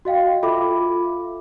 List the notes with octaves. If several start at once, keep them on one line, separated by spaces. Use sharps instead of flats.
F#4 D#5 F5 G5
F4 A4 E5 B5 D6